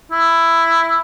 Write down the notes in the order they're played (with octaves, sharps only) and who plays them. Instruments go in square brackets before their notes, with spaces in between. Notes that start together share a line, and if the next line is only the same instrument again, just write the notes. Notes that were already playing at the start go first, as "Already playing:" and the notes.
[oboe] E4